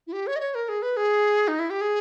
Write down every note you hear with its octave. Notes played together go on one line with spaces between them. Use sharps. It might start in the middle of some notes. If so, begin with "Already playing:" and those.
E4
G4
C#5
D#5
C#5
A#4
G#4
B4
G#4
D#4
E4
G4
G#4